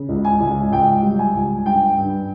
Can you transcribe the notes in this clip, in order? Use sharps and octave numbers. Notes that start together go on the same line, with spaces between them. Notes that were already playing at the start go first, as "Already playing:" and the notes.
Already playing: C#3
C#2
G#5
C#2
C#2 G5
G3
G#5
C#2
G2 G5
G2